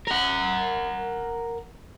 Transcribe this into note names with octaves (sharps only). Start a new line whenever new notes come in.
A#4 F#5